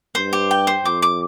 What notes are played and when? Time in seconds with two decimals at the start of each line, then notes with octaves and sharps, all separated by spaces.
0.14 G2 C5
0.33 G4
0.51 G5
0.67 C5
0.85 F2 D6
1.02 D6